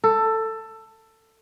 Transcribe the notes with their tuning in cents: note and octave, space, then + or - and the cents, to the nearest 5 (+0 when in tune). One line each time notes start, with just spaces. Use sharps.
A4 +15